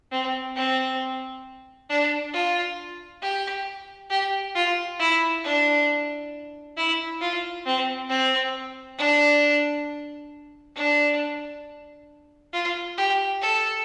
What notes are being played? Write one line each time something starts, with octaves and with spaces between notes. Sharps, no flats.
C4
C4
D4
F4
G4
G4
F4
E4
D4
E4
F4
C4
C4
D4
D4
F4
G4
A4